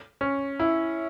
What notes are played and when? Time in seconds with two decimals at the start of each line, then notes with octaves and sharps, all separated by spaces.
0.21 C#4
0.60 E4